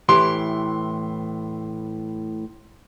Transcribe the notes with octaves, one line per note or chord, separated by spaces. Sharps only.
A2 E3 G4 C6